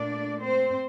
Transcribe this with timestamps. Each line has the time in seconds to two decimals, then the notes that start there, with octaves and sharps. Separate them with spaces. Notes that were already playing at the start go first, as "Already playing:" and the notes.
Already playing: A#2 A3 D4 D5
0.42 C4 C5